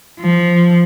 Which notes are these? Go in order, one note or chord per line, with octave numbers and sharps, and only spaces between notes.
F3